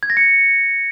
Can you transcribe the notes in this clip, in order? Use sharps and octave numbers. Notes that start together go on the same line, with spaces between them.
G#6
A#6
C#7